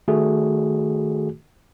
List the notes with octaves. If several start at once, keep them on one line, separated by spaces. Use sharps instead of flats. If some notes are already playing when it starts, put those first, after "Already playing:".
D#3 A3 F#4 G#4